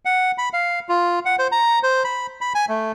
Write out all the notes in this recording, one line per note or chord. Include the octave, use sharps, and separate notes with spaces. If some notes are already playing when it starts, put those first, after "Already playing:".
F#5
B5
F5
F4
F#5
C5
A#5
C5
B5
B5
G#5
A3